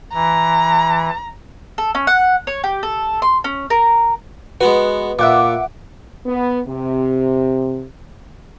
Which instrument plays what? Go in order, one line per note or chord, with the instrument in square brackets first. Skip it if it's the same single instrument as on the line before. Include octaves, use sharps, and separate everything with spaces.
[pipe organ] E3 [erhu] A#5
[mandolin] A4
C#4
F#5
C#5
G4
A4
C6
C#4
A#4
[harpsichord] G#3 B3 F#4 [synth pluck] B4
[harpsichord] A#2 [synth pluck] E5 F#5 D6
[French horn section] B3
C3